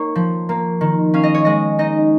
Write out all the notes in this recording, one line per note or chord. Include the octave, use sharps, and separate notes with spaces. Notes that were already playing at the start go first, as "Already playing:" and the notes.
Already playing: A#3 D#4 C#5
F3
A#3
D#3
C#4 F5
D#5
C#5
G#3 D#5
D#4 D#5